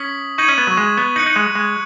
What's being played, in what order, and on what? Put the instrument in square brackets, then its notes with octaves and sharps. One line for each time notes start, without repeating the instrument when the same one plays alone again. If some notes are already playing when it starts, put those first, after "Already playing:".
Already playing: [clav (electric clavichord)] C#4 [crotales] D#6 B6 F#7
[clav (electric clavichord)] D#4 [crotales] C#6 G#6 D#7 F#7
[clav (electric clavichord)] C#4
B3
F#3
G#3
B3
[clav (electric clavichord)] D#4 [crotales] F#6 C#7 F#7
[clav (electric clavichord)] D#4
G#3
G#3